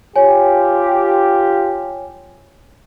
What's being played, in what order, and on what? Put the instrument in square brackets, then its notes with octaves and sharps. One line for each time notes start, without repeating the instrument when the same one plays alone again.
[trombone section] F4 G4 [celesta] C#5 G#5